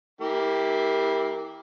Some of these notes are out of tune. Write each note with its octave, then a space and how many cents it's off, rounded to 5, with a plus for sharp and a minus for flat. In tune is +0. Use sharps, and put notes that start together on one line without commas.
E3 -25 A#3 +0 G4 +10